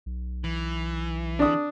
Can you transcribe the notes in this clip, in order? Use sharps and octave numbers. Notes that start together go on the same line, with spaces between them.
B1
E3
D4 D#6